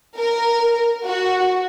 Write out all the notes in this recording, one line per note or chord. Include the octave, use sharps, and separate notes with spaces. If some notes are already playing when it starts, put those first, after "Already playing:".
A#4
F#4